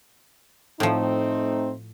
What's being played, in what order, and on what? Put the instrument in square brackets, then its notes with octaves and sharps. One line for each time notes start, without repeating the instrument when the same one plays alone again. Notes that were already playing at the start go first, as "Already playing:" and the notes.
[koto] A2 F3 [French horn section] A3 C4 D#4